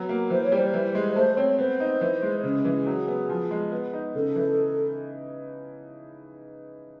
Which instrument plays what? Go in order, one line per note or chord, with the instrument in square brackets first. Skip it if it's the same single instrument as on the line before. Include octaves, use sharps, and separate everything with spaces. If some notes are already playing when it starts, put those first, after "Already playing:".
Already playing: [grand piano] F#3 B3
A#3
[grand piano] E3 [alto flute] C5
[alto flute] C#5
[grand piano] G3 [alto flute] C5
[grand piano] E3
G#3
[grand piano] A3 [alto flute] C5
[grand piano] C4 [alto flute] C#5
[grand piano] B3 [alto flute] C5
[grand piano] D#4
E3
G#3
[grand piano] C#3 [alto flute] G#4
[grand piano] E3
F#3
B3
F3
G#3
B3
D#4
[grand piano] C#3 [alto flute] A4
[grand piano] E3